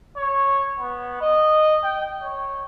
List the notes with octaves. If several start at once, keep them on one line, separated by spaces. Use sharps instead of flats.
C#5
B3
D#5
G5
C#5